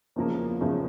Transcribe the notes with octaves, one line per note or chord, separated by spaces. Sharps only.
E2 C#3 F3 A#3
E2 C#3 F3 A#3